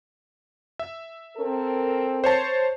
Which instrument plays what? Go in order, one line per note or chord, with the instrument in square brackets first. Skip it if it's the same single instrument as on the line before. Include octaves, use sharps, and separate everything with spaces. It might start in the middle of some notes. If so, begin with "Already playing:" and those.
[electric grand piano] E5
[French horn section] C4 A4 A#4
[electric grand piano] C5 C#5 A5